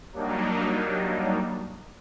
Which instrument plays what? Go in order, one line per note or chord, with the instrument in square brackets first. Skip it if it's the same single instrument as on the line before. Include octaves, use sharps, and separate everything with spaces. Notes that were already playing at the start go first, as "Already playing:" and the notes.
[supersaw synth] F#3 G3 A#3 D4 D#4